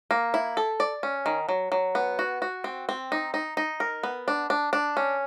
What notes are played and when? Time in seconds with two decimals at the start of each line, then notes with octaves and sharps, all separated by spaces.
0.11 A#3
0.34 E4
0.57 A4
0.80 D5
1.03 C#4
1.26 D#3
1.49 F#3
1.72 F#3
1.95 B3
2.19 F#4
2.42 F#4
2.64 C4
2.89 C4
3.12 D#4
3.34 D#4
3.57 D#4
3.80 A#4
4.03 B3
4.28 D4
4.50 D4
4.73 D4
4.97 C#4